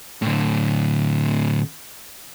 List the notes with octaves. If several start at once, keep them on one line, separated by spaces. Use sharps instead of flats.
A2 D3